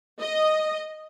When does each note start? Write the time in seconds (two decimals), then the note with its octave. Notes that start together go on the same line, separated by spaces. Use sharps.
0.22 D#5